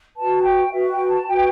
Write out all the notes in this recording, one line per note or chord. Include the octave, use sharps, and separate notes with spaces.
F#4 B4 A5
G5
F#4 B4 E5
G5
A5
F#4 B4 G5